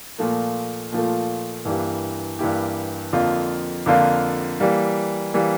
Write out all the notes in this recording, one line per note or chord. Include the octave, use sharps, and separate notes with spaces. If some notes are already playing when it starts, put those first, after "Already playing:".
A#2 F3 A3
A#2 F3 A3
G2 E3 A#3 E4 G4
G2 E3 A#3 E4 G4
F2 D3 F3 A#3 F4
F2 D3 F3 A#3 F4
E3 G3 A#3
E3 G3 A#3